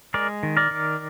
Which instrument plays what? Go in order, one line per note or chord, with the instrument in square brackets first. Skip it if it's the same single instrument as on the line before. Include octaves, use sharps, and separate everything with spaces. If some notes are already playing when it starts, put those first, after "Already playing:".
[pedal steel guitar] G#3 A#4 D5
D#3
A#4 D5
D#3